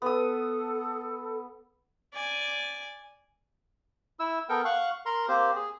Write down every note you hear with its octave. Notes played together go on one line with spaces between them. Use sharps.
B3 A4 D#6
D5 G#5
E4 E6
B3 A4 A#4 G5
F5 F#5 C#6 F#6
A#4 A#5 C6
A#3 C4 G4 C5
G#4